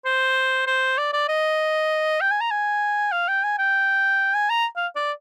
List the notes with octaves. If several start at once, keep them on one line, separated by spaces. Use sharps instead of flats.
C5
C5
D5
D5
D#5
G5
G#5
A#5
G#5
F5
G5
G#5
G5
G#5
A#5
F5
D5